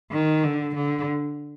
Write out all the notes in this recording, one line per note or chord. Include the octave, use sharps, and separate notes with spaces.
D#3
D3
D3